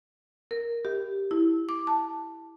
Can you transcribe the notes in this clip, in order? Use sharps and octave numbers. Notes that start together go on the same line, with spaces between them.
A#4
G4
E4
D6
A5